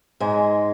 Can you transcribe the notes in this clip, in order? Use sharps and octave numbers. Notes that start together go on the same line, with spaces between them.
G#2 G#3